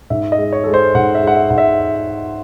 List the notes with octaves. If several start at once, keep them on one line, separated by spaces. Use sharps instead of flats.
G#2 E5
D#5
G#3
C#5
G#3 A4
C5
G#2 F#5
E5
G#3 F#5
E5
G#2 F#5
E5